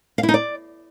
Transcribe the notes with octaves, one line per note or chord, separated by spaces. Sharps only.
F5
E4
D#4
D5